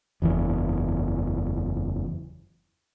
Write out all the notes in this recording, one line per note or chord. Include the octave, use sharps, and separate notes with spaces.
F#1 E2 E3